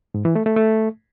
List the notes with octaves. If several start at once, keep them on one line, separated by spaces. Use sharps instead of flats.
G#2
E3
A3
A3
A3